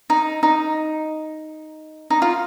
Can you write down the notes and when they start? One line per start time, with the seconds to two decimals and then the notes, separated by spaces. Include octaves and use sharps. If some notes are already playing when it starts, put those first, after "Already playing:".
0.10 D#4
0.43 D#4
2.10 D#4
2.22 F4